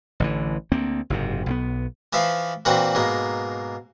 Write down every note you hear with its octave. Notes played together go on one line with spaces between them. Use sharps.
A1 D3 E3
D2 A#3 C4
F#1 G#2 C3
B1 G3 B3
E3 F3 E5 F5
A#2 E3 C4 F#4
G#2 B2 A#3